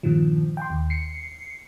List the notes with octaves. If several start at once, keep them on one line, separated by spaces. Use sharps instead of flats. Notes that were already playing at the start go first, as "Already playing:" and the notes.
G2 A#2 D#3 F3
G5 C6
D#2
C7 C#7